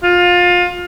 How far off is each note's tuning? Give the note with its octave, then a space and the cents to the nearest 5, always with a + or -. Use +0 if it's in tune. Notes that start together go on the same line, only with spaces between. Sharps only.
F4 +25